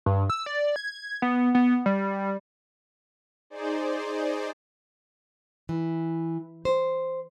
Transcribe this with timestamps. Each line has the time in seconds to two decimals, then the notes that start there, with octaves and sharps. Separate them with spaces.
0.06 G2
0.30 E6
0.46 D5
0.76 G#6
1.22 B3
1.55 B3
1.86 G3
3.50 D#4 G#4 C5 D5
5.69 E3
6.65 C5